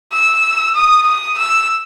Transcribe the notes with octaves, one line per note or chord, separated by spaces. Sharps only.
E6
D#6
D#6
E6